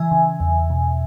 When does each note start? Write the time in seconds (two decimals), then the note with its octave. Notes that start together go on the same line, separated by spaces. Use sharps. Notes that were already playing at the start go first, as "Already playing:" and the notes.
Already playing: C#3 E3 E5 G#5
0.11 C#3
0.40 E2
0.70 B2